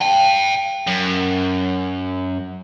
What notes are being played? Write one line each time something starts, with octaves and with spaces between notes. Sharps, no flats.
G5 A5
F#2